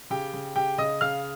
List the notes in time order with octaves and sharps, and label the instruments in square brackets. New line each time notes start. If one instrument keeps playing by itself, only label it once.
[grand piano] C#3 G4 G5
C#3
C#3 G4 G5
C#3 D#5 D#6
C#3 F5 F6